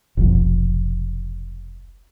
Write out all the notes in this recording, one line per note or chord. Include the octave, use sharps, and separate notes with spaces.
F1 B1 F2